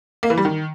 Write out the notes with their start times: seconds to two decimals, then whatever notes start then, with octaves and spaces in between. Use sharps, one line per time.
0.23 A#3
0.30 E3
0.37 G3
0.45 D#3